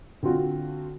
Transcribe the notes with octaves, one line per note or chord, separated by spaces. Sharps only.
D3 C4 F4 F#4